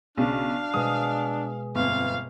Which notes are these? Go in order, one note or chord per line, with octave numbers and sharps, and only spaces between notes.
B1 C#3 D4 F5
B2 G#3 D#6
G1 F2 F5